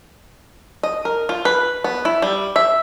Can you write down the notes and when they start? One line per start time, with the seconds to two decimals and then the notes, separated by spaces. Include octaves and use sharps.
0.83 D#5
1.05 A#4
1.29 F4
1.45 B4
1.84 B3
2.05 E4
2.22 G3
2.56 E5